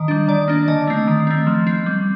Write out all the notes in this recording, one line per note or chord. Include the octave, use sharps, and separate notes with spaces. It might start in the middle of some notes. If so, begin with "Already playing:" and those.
Already playing: D#3 D#5
G3 D4
D#3 D5
A#3 D4
D3 D#5
A3 C4
D#3
A3 C4
F3
C4
G3